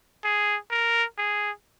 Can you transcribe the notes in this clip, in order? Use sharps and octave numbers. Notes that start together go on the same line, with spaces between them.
G#4
A#4
G#4